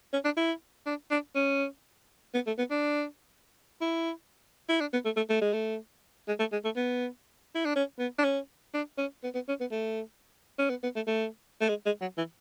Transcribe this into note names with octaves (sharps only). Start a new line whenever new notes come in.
C#4
D4
E4
D4
D4
C#4
B3
A3
B3
D4
E4
E4
D4
B3
A3
A3
A3
G#3
A3
G#3
A3
G#3
A3
B3
E4
D4
C#4
B3
D4
C#4
D4
C#4
B3
B3
C#4
B3
A3
C#4
B3
B3
A3
A3
A3
G#3
G#3
F#3
E3